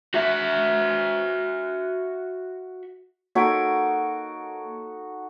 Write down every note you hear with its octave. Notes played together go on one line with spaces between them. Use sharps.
F#4 E5
A#3 D#4 F#4 A4 G#6 D7